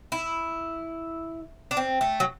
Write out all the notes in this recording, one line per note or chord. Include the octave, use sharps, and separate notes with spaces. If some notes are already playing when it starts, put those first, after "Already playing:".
E4
D4
C4
A3
F#3